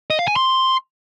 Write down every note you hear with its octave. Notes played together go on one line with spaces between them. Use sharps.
D#5
F5
G#5
C6